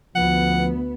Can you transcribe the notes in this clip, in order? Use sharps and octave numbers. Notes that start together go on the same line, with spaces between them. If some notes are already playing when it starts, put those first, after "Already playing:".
D2 F3 B3 F#5